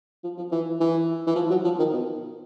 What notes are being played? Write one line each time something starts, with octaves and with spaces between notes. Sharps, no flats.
F3
F3
E3
E3
E3
F3
F#3
F3
D#3
B2